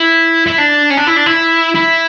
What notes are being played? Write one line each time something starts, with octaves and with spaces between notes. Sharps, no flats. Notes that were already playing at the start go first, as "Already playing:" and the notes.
Already playing: E4
E4
D4
C#4
D4
E4
D4
E4
E4